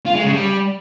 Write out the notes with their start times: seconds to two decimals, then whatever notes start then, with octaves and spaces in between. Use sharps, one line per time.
0.06 F4
0.15 G#3
0.24 C#3
0.33 G3